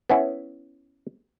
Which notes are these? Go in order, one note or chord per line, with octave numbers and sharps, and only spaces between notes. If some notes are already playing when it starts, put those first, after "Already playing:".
B3 C#4 E4